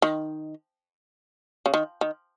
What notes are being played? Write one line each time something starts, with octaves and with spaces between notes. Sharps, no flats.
D#3
C#3
D#3
D#3